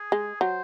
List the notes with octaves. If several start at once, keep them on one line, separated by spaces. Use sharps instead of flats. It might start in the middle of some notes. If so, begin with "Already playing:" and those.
Already playing: G#4
G#3
F#3 C5